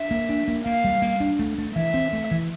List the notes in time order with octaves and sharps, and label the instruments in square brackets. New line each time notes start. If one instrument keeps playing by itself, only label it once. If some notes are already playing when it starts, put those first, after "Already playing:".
Already playing: [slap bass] D4 [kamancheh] E5
[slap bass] A#3
D4
A#3
[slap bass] A#3 [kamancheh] F5
[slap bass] G3
A#3
D4
A3
A3
[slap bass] E3 [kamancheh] E5
[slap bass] C4
A3
E3